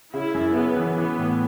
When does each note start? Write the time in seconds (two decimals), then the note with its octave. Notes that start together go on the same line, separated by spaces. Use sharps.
0.14 C#3 E4
0.34 F#2
0.55 C#3 B3
0.77 E3
0.98 E3 B3
1.19 A2